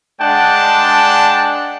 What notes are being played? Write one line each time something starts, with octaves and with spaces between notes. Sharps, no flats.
G#3 D4 D5 F#5 G5 A5